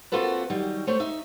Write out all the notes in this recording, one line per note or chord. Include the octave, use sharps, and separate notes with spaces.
A#3 C4 F4 F#4 A4 B4
D#3 F#3 G3
A3 C5 C#5
D#4 E5